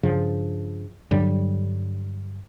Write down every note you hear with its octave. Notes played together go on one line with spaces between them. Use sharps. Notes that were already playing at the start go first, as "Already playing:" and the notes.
G2 C#3 F3
G2 D3 F#3 G3